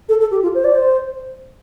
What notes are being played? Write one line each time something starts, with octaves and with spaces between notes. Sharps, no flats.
A4
A4
G4
F4
C5
D5
C5